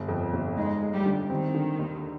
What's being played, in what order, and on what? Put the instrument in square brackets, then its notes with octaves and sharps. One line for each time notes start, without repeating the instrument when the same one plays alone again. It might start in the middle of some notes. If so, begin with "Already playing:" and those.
Already playing: [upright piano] G1
F2
G1
[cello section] G#3 [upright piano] D#4
[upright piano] G#3
[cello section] G3
[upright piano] D3
[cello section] D#3 [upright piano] C4
[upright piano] D3
D#2